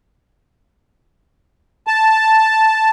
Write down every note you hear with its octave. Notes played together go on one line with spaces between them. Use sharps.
A5